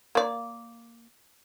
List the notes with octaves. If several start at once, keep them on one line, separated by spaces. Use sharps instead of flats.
A#3 D5